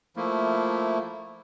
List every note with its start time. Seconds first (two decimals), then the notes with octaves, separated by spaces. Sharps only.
0.16 F3 A3 A#3 E4